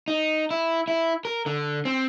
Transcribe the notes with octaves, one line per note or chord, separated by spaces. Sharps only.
D#4
E4
E4
A#4
D3
C4